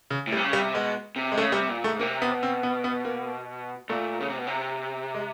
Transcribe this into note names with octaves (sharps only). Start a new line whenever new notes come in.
C#3
A2
G3
C3
C#3
G3
C3
B2 G#3
C3
G#3
C#3 A3
C3 G3
A#2
G#2 A3
C3 A#3
B3
B2
C4
B3
B3
A#3
A#2 A3
C#3
C3
B2
C3
G#3